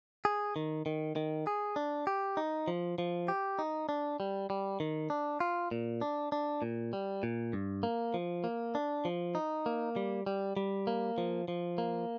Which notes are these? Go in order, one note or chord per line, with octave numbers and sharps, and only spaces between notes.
G#4
D#3
D#3
D#3
G#4
D4
G4
D#4
F3
F3
G4
D#4
D4
G3
G3
D#3
D4
F4
A#2
D4
D4
A#2
G3
A#2
G2
A#3
F3
A#3
D4
F3
D#4
A#3
G3
G3
G3
A#3
F3
F3
A#3